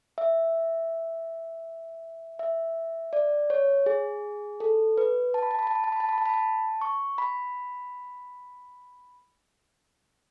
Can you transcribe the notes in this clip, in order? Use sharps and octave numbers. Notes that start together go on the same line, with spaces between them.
E5
E5
D5
C#5
G#4
A4
B4
A5
B5
A5
B5
A5
B5
A5
B5
A5
B5
A5
B5
A5
C#6
B5